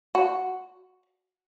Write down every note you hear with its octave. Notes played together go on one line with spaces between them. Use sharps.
F#4